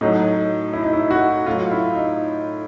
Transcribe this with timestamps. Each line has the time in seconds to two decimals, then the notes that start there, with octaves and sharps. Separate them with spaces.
0.01 A2 F#3 D#4
0.73 E4
0.83 D#4
0.93 E4
1.11 F#4
1.46 A2 F#3 F4
1.71 E4
1.95 D#4